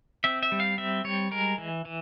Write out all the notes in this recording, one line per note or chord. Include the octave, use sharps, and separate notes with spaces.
C4 E5
E5
G3
F5
C4 E5
G3 C#5
G#3 A#4
E3
E3